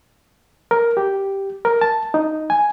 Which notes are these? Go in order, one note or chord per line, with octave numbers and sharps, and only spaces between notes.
A#4
G4
A#4
A5
D#4
G#5